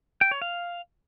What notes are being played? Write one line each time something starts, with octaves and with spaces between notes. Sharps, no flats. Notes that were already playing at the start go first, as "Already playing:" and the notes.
G5
C#5
F5